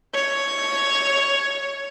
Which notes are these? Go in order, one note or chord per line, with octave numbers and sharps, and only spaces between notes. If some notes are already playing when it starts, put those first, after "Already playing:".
C#5